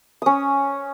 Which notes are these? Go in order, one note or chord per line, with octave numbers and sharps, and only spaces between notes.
C#4 D#6